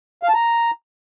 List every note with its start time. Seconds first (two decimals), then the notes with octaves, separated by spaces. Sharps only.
0.23 F5
0.29 A5
0.34 A#5